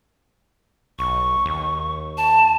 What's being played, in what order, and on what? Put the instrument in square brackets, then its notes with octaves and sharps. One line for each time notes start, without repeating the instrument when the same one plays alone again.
[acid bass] B1 [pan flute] C#6
[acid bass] D#2
[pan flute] A5